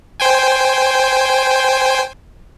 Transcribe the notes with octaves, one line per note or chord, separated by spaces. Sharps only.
C5 G5 G#5